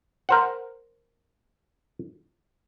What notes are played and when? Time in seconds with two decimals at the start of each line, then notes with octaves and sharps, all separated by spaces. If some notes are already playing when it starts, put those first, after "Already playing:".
0.29 A#4 C5 F#5